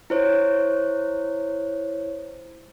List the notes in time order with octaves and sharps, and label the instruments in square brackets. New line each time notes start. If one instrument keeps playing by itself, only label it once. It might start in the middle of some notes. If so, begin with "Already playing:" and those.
[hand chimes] E4 C5 C#5